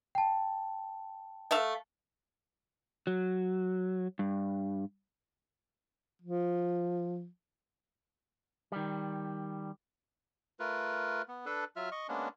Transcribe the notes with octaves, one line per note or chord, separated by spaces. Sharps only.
G5 A5
A3 E5 F5
F#3
G2
F3
D#3 G3
A3 F4 A#4 B4
B3
D4 A4 B4
F#3 F4 E5 F6
D#5 C#6
G#3 A#3 B3 C#4 D4